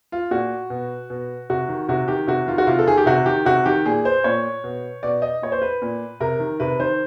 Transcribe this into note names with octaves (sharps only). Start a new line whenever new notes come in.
F4
A#2 F#4
B2
B2
C3 F#4
D#3
C3 F#4
D#3 G4
C3 F#4
D#3 F4
F#4
C3 F4
A4
D#3 G#4
G4
C3 F#4
D#3 G4
C3 F#4
D#3 G4
A#2 G#4
C5
A#2 C#5
B2
B2 D5
D#5
A#2 C#5
C5
B4
A#2
C3 A#4
D#3
C3 B4
D#3 C5